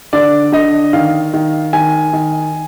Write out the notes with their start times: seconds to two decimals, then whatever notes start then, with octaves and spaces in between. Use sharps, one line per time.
0.13 D3 D5
0.52 D3 D#5
0.93 D#3 F5
1.34 D#3
1.73 D#3 G#5
2.13 D#3